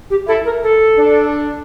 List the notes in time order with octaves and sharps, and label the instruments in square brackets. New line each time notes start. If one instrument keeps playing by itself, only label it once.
[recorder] G4
[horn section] E4 [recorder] A4
[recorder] A#4
A4
[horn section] D4